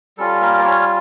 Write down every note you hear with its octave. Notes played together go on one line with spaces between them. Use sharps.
G3 C#4 F4 A4
A#3 A#4
D5
C#4 C#5